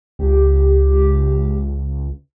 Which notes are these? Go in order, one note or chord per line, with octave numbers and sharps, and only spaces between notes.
C#2 G4